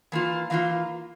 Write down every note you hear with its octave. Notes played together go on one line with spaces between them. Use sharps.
E3 A#3 F4
E3 A#3 F4 F5